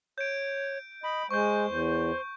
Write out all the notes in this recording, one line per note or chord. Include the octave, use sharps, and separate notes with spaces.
C#5 G6 D7
D#5 B5
G#3 C5 C#6 G6
E2